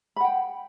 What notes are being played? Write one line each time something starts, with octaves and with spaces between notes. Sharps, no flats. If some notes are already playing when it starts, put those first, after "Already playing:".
F#5 G5 B5